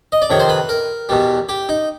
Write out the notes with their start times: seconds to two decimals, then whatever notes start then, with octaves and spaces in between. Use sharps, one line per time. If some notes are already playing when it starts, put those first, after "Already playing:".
0.12 D#5
0.22 D5
0.30 F2 C3 D#3 C#5
0.40 C5
0.49 B4
0.69 A#4
1.09 E2 B2 G3
1.49 G4
1.69 D#4